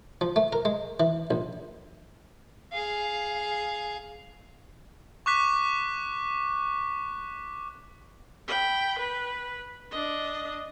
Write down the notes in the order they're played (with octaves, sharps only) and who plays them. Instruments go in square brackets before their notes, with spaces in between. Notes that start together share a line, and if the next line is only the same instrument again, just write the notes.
[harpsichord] F3
A3
A#4
G#3
E3
A#1
[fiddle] G#4 F5
[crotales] C#6 D6 F#6 B6
[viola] G5 B5
B4
D4 D#5